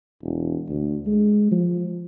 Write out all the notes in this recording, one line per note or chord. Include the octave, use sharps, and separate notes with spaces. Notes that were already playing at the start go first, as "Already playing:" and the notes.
E1
D2
G#3
F3